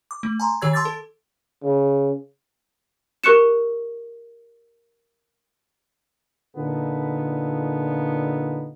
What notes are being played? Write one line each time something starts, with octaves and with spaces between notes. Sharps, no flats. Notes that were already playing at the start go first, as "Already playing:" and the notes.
D6
A3
G#5 A#5 C6
D#3 G4 C#5 E6 G#6
A5 C6 D6 E6 G#6 A6
A4
C#3
G4 A#4 C#6 F#6 C#7 E7
A#2 D3 B3 D#4 F4 A4